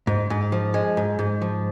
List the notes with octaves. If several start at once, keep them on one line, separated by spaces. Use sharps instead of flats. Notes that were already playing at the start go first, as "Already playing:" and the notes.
G#2
G#2
F3
G#3
G#2
G#2
F3